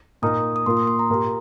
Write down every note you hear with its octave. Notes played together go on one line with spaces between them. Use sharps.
A#2 A#3 D#4 A#4 D#6
D#6
A#2 A#3 F4 A#4 C6
D#6
C6
A#5
A#2 A#3 G4 A#4